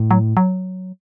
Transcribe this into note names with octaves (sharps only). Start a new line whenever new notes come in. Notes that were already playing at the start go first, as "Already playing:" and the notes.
Already playing: A2
F#3
F#3